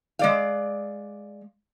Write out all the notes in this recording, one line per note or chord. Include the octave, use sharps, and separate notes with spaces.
G#3 D5 F5